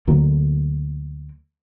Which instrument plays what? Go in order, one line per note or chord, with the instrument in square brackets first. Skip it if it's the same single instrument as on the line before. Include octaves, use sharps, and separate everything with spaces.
[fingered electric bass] D2 D3 F#3 A#3